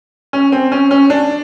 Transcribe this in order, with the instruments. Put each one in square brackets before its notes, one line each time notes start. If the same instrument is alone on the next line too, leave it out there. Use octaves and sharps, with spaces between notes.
[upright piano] C#4
C4
C#4
C#4
D4